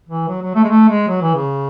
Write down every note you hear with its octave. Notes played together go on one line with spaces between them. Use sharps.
E3
F#3
F#3
A3
G#3
A3
G#3
F#3
E3
C#3